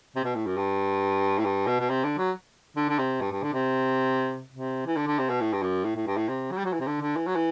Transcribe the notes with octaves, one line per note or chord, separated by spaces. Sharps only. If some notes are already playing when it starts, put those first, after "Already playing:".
C3
B2
A2
F#2
G2
A2
G2
B2
B2
C3
D3
F#3
D3
D3
C3
G2
G2
D3
C3
C3
E3
D3
D3
C3
B2
A2
G2
F#2
A2
A2
G2
A2
C3
F#3
G3
F#3
E3
C3
D3
D3
E3
F#3
E3